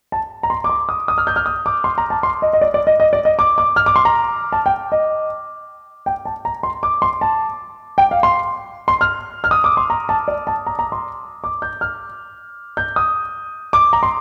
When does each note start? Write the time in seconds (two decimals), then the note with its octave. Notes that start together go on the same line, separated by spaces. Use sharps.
0.12 A5
0.43 A#5
0.50 C6
0.64 D6
0.69 C6
0.89 D#6
1.08 D#6
1.18 F6
1.27 G6
1.36 F6
1.46 D#6
1.66 D6
1.84 C6
1.98 A#5
2.10 A5
2.23 C6
2.42 D#5
2.53 D#5
2.61 D5
2.74 D5
2.87 D#5
3.00 D#5
3.13 D5
3.25 D#5
3.39 D6
3.58 D6
3.76 F6
3.86 D6
3.96 C6
4.05 A#5
4.52 A5
4.66 G5
4.92 D#5
6.06 G5
6.25 A5
6.45 A#5
6.63 C6
6.83 D6
7.02 C6
7.21 A5
7.98 G5
8.11 F5
8.23 C6
8.88 C6
9.01 F6
9.44 F6
9.51 D#6
9.64 D6
9.77 C6
9.90 A#5
10.09 A5
10.28 D5
10.47 A5
10.67 A#5
10.79 A#5
10.92 C6
11.44 D6
11.62 G6
11.81 F6
12.77 G6
12.96 D#6
13.73 D6
13.93 A#5
14.03 C6